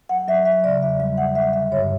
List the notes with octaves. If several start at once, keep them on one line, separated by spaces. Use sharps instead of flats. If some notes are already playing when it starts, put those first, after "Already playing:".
F#3 F#5
F#3 E5
F#3 E5
C#3 D5
E2 E5
G3 E5
G3 F#5
G3 E5
D3 E5
G2 C#5